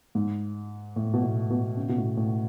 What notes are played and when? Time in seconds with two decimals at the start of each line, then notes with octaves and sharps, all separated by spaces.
0.15 G#2
0.96 A2
1.13 B2
1.23 A2
1.50 B2
1.77 C#3
1.89 B2
1.97 A2
2.17 A2